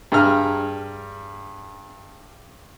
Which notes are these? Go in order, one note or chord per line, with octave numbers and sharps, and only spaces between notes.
G2 G#4 A#5 F6